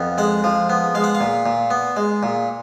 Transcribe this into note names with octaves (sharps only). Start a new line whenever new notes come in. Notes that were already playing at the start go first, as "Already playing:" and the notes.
Already playing: F2 B3
G#3 F#5
F3
B3
G#3 F5
F#5
F5
A#2
A#2
B3
G#3
A#2